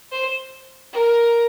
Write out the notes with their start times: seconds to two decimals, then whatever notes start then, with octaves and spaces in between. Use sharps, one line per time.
0.12 C5
0.93 A#4